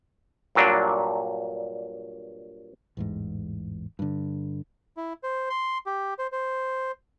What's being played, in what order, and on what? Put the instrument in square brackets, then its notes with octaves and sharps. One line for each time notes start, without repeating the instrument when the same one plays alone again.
[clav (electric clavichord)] G2 A#2 F#3 D4
[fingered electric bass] A1 E2 G#2
G2 D3
[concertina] E4
C5
C6
G4
C5
C5